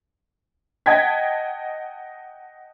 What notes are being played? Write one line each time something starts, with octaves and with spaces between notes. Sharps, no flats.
D#5 F#5 G5 A5 G#6 B6